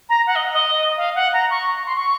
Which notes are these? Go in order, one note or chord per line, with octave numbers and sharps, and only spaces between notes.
A#5
F#5
D#5
D#5
F5
F#5
A#5
C#6
C#6
C6
C#6